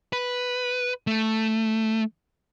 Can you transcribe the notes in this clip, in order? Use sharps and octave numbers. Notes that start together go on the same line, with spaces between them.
B4
A3